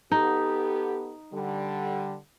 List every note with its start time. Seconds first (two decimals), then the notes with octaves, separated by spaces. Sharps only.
0.12 B3 D#4 G4 A4
1.33 D3 G3